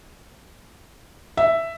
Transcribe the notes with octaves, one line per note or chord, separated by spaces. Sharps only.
E5